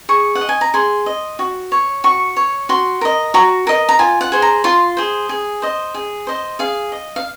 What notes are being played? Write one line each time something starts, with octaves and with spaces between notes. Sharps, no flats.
G#4 C#6
F#5
D#5
G#5
A#5
G#4 C6
D#5
F#4
C#5
F#4 C#6
C#5
F#4 C6
A#4 D#5
F#4 A#5
A#4 D#5
A#5
F4 G#5
F#5
G#4 C5
A#5
F4 C6
G#4 C5
G#4
C5 D#5
G#4
C5 D#5
G#4 F5
D#5
F5